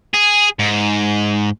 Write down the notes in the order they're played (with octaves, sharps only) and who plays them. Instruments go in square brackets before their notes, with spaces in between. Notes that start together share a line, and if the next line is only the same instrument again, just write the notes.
[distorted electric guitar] G#4
G#2